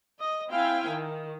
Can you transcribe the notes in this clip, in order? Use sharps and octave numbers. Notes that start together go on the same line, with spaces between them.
D#5
C4 E4 F5 G5 G#5
D#3